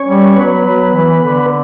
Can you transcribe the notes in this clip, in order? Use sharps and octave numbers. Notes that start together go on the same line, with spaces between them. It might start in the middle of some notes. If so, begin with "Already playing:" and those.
Already playing: C#4 C#5
G3
F#3 B3 B4
F#3
E3
D3